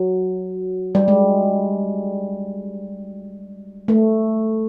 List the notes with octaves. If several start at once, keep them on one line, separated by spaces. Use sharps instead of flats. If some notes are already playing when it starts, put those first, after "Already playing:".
Already playing: F#3
G3
G#3
A3